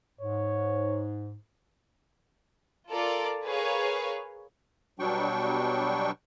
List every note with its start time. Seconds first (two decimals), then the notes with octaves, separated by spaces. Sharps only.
0.21 G#2 C#5
2.90 F4 A4 A#4 D5
3.44 G#4 A#4 B4 C#5 F5
4.99 B2 F#3 G3 D4 G5 C#6